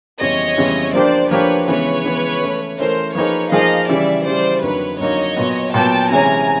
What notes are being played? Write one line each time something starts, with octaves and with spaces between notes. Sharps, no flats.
F2 C#3 E3 G3 B3 C#5 D#5
F2 C#3 E3 G3 B3
F3 A#3 D4 G4 C5 D5
F3 A#3 D4 G4 B4 C#5
C#3 E3 G#3 B3 B4 C#5
C#3 E3 G#3 B3
E3 A3 C#4
E3 A3 C#4 A#4 C5
F3 A#3 D#4 G#4 B4 C#5
F3 A#3 D#4 G#4 D#5 F5
C#3 E3 G3 D5 E5
C#3 E3 G3 C5 D5
F2 D3 F#3 A#3 D#4 B4 C#5
F2 D3 F#3 A#3 D#4 C#5 D#5
A#2 F#3 B3
A#2 F#3 B3 G5 A5
C3 E3 G#3 C#4 G#5 A#5